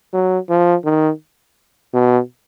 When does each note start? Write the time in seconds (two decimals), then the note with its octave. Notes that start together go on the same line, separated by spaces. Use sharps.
0.13 F#3
0.50 F3
0.85 D#3
1.93 B2